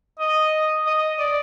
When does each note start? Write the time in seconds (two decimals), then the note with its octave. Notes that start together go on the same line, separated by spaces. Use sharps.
0.19 D#5
0.86 D#5
1.19 D5